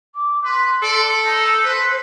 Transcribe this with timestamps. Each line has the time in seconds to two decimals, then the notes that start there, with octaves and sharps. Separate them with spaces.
0.15 D6
0.44 B4 C6
0.83 A4 D5
1.25 D#4 A5
1.63 B4 C5